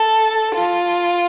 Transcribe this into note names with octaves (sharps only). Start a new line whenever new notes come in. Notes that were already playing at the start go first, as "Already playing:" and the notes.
Already playing: A4
F4